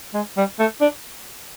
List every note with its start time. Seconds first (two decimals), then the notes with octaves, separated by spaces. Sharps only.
0.14 G#3
0.37 G3
0.59 A3
0.81 D4